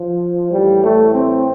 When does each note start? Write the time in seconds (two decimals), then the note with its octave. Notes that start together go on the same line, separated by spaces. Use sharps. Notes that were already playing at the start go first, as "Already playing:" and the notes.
Already playing: F3
0.49 A2 E3 G3
0.80 A3
1.12 C4